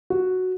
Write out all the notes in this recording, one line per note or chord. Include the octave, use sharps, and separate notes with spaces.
F#4